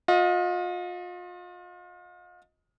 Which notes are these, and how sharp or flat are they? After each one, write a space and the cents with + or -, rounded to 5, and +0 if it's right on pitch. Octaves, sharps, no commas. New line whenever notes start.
F4 +35 D#5 +15